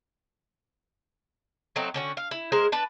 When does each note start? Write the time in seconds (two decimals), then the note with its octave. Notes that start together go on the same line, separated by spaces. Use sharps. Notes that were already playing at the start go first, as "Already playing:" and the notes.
1.76 F#3 A3 C4 D#4
1.94 D3 C#4 F#4
2.17 F5
2.31 E4
2.52 G#3 G#4 A#4 C5
2.72 D4 B4 A5